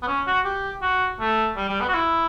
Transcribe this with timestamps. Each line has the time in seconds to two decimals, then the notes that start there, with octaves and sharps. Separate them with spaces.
0.02 B3
0.07 C#4
0.27 F#4
0.45 G4
0.82 F#4
1.20 A3
1.56 G3
1.69 G3
1.80 B3
1.88 F#4
1.94 E4